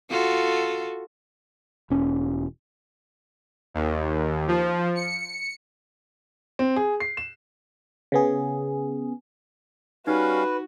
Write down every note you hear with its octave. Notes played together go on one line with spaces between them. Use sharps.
F4 F#4 A4
E1 C#4
D#2
F3
C#7
C4
G#4
C7
E7
C#3 B3 G#4
G3 C#4 D#4 F#4 B4 F5